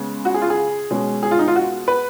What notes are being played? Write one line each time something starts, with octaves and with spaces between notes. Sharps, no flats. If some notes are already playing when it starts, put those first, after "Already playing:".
Already playing: C#3 G#3 B3
F#4
G#4
F4
G#4
B2 G#3 C#4
G#4
F4
D#4
F4
F#4
B4